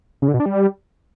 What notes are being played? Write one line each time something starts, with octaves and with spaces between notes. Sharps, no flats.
C#3
D3
B2
D4
G3